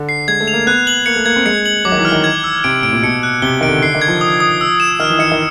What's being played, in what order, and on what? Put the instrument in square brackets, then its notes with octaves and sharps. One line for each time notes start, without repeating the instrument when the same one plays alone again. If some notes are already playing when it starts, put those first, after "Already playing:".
Already playing: [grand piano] D3
[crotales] C7
[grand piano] G#3 [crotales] G#6
[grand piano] A3
[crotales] F7
[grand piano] A#3
[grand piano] B3 [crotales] F#6
[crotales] F#7
[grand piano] A#3 [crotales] C#7
[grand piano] A3
[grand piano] A#3 [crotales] G#6
[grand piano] C4
[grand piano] G#3 [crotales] C#7
[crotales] F#7
[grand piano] F#3 [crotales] D6
[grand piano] D#3
E3
[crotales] F6
[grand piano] D#3
[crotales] G#6
E6
[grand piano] C3 [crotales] D7
[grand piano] A2 [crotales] D7
[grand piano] A#2
[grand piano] B2 [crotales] C#7
[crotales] F#6
[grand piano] C3 [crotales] G7
[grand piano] D#3 [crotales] D7
[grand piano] D3
[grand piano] D3 [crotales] C7
[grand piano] D#3
[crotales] G#6
[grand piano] F3
[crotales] D#6
D#6
E6
E7
[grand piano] D#3 [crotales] F6
[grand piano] E3
[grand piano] D#3 [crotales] C#7
[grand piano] D#3